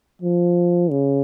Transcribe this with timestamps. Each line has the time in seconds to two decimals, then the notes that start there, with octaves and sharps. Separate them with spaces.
0.22 F3
0.91 C#3